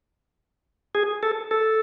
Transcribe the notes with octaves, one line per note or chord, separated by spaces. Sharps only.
G#4
A4
A4